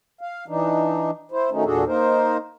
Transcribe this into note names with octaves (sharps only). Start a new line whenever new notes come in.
F5
E3 D4 D#4
E4 C5
D#3 F#3 A3 C#4 D#4
E2 A#2 D4 F#4 G#4 A4
A#3 D#4 A#4 C5